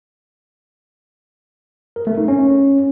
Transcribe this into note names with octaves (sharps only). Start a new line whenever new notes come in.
A#4
A3
D#4
C#4